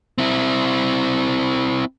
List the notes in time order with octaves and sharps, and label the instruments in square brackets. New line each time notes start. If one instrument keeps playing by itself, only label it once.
[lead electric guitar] C4 E4